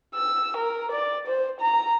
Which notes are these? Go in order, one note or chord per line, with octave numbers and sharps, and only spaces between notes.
E6
A#4
D5
C5
A#5